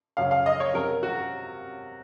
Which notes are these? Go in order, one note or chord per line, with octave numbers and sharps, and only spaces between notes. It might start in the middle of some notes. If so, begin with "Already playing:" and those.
F#2 C#3 F#3 F5
F5
D#5
C#5
C3 F#3 A#4
F#4